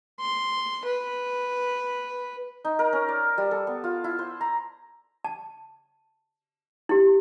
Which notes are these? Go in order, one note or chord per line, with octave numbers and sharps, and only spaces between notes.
C6
B4
D#4
A#4
C#4
D5
G3
A4
B3
F4
E4
C5
A#5
A5
E4 G4